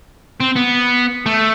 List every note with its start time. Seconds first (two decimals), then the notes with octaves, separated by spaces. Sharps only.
0.40 C4
0.56 B3
1.26 A3